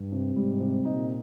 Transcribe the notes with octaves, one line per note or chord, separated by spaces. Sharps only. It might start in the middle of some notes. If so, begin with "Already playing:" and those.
Already playing: G2
C3
G#2 G3
C3
A#2 D#4